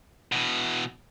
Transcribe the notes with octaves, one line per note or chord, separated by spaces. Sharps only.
B2 E3